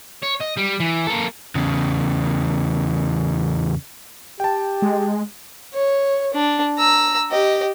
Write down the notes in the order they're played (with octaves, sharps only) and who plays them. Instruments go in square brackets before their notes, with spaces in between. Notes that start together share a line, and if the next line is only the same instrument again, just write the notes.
[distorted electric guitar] C#5
D#5
G3
E3
A#3 A4
[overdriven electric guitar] E2 C#3
[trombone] G4 [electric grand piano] G5 A5
[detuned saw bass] G#3
[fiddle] C#5
D4
A#5 E6
G4 D#5